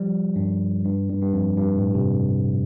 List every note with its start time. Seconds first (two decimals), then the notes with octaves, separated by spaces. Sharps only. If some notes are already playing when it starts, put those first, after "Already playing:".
Already playing: F3 G3
0.36 G2
0.85 G2
1.09 G2
1.22 G2
1.33 F2
1.58 G2
1.76 A2
1.94 C3